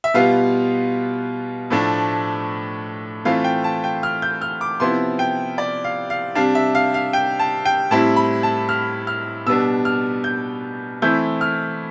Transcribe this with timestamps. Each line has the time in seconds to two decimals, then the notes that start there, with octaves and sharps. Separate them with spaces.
0.04 E5
0.14 B2 G3 B3 F4 F5
1.70 A2 F3 A3 D4
3.25 E3 A3 C4 F4 F5
3.44 G5
3.64 A5
3.84 G5
4.03 F6
4.22 G6
4.41 F6
4.61 D6
4.80 C3 F3 B3 E4 C6
5.19 G5
5.58 D5
5.84 F5
6.10 F5
6.35 C3 G3 D4 F5
6.55 E5
6.75 F5
6.94 F5
7.13 G5
7.39 A5
7.65 G5
7.91 A2 G3 C4 E4 A5
8.16 B5
8.43 A5
8.69 F6
9.07 F6
9.46 B2 G3 B3 D4 E6
9.85 F6
10.24 G6
11.02 E3 A3 C4 E4 G6
11.41 F6